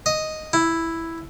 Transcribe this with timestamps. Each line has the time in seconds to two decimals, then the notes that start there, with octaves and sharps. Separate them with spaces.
0.06 D#5
0.53 E4